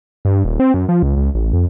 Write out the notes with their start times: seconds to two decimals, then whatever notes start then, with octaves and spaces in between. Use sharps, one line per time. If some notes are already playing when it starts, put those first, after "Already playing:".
0.25 G2
0.45 D#1
0.60 C4
0.74 F#2
0.89 F3
1.03 C#2
1.17 C#2
1.35 A1
1.53 F2